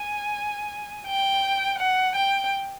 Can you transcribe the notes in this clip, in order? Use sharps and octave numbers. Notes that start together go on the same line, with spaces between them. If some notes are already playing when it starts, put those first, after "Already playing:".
Already playing: G#5
G5
F#5
G5